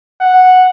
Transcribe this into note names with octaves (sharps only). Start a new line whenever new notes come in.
F#5